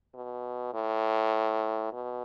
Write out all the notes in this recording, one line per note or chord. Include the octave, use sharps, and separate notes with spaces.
B2
A2
B2